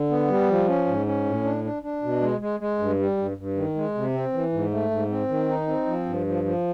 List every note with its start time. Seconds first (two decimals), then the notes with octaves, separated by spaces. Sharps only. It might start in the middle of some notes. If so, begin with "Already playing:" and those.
Already playing: D3
0.10 B3
0.28 G3
0.48 F3
0.68 C#4
0.86 G#2
1.06 C#4
1.25 A2
1.44 D4
1.64 D4
1.82 D4
2.02 B2
2.21 G#3
2.40 G#3
2.60 G#3
2.79 G2
2.99 G3
3.17 G2
3.37 G2
3.56 D#3
3.75 G#3
3.95 C3
4.14 C4
4.33 E3
4.53 G#2
4.71 A3
4.91 G#2
5.10 C4
5.29 D#3
5.49 D#4
5.67 C4
5.86 F3
6.06 G2
6.26 F3
6.44 F3